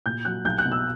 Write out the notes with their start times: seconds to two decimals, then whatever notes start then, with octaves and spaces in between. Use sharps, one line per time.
0.06 A#2 G6
0.25 F#3 F#6
0.45 B1 G6
0.58 F#6
0.65 B2
0.72 E6